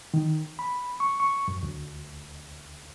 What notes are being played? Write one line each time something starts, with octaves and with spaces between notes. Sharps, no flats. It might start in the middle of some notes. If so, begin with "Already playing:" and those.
D#3
B5
C#6
C#6
F#2
D2